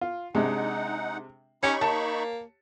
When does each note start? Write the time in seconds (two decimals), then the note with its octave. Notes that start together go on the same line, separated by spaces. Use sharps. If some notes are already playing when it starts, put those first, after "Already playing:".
0.01 F4
0.35 C3 G#3 D4 D#4 F#5
1.63 C#4 D#4 G4 C#5 B5 C#6 C#7
1.81 A#3 A5